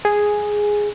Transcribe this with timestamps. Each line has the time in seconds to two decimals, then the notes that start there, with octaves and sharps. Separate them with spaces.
0.05 G#4